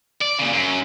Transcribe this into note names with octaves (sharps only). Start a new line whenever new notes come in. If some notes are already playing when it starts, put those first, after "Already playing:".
D5
A#2 C#3
F#2